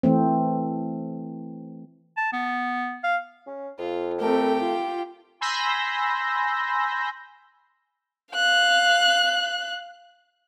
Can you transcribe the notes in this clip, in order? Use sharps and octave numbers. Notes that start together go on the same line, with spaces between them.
E3 A3 C4
A5
B3
F5
C#4
F2 F4
A3 C4 G4 A#4 G5
F4
G#5 B5 C6 E6 G6 A#6
F5 F#6